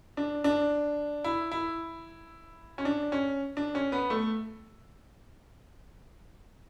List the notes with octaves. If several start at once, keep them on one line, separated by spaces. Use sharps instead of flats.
D4
D4
E4
E4
C#4
D4
C#4
D4
C#4
B3
A3